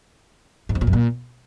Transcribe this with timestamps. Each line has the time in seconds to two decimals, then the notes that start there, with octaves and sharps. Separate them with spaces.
0.69 G#2
0.75 F2
0.81 A#2
0.87 F#2
0.93 A#2